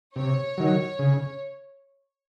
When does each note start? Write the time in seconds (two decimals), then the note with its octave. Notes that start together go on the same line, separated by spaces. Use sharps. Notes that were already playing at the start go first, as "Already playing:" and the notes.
0.16 C3 C#5
0.58 D#3 F#3
0.99 C#3